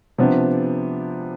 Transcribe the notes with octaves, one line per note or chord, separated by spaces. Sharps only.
C3 F3 B3 D4